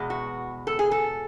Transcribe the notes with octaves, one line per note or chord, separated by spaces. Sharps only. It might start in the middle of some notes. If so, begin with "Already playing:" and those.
Already playing: E2 B2 G#3
F#4
A4
G#4
A4